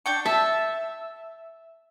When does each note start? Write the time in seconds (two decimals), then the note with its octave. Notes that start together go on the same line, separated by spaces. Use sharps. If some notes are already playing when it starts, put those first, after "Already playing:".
0.06 D4 G5 C#6
0.26 E5 A5